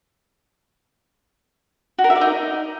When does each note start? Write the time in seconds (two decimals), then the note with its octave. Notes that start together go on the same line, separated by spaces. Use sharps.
1.98 F#4
2.04 A#4
2.10 E5
2.16 D5
2.21 D#4